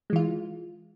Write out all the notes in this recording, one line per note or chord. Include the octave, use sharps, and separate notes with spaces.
E3 G#3 F4